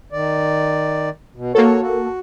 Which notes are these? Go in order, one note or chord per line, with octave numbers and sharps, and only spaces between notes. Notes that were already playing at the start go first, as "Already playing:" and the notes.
D#3 D5
B2
A#3 F#4 A4 C#5
F#4